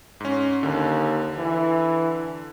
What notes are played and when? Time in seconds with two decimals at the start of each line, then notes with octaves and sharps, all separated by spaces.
0.20 G#2 C#4
0.63 D#2 D3
1.38 E3